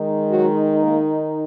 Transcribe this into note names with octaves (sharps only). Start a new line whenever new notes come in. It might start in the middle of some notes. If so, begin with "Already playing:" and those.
Already playing: D#3 G#3 D#4
F#3 F#4
A#3 A#4